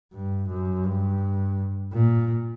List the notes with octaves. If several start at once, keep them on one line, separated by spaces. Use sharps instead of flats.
G2
F#2
G2
A#2